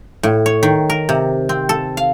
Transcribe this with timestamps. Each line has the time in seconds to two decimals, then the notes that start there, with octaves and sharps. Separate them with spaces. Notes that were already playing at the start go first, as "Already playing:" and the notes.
0.23 A2
0.46 C#5
0.63 D#3
0.90 A#4
1.09 C3
1.49 C4
1.69 A4
1.97 F5